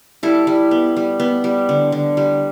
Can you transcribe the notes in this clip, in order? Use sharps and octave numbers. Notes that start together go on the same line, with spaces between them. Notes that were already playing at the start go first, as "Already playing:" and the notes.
G3 E4 A4
G3
B3
G3
B3
G3
D3
D3
G3